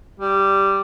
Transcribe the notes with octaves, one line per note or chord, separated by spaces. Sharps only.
G3